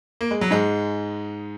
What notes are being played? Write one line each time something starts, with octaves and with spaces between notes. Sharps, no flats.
A#3
G#3
F#3
G#2 G#3